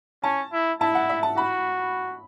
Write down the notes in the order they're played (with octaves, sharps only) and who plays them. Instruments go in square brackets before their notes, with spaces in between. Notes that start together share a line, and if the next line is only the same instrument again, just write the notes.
[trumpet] C#4 [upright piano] A5
[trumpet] E4
[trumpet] E4 [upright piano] A5
[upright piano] F#5
E5
A5
[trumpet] F#4 [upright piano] B5